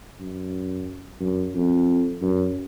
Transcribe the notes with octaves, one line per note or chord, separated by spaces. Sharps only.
F#2
F#2
F2
F#2